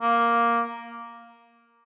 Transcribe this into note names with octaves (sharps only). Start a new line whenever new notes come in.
A#3